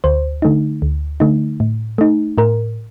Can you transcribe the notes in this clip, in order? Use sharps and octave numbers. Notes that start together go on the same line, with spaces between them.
D2 C5
D3 A3 D#4
D2
D3 A3 D#4
A2
A3 D#4
A2 A#4